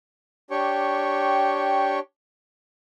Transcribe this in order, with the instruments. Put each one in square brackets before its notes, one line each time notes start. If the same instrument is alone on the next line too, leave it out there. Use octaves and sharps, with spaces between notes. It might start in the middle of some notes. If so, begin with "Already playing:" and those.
[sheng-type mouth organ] D4 G4 C#5 G5 C#6